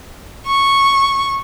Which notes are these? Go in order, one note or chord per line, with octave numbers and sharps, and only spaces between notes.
C#6